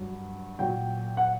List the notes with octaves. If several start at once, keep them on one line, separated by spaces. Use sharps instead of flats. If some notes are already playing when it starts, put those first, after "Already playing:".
Already playing: G2 F#3
A#2 F#3 G5
F#5